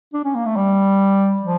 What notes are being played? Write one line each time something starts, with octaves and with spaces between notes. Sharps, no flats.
D4
C#4
A#3
A3
G3
F3